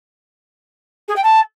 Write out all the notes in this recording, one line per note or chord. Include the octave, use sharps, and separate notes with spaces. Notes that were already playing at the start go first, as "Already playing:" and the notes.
G#4
G5
A5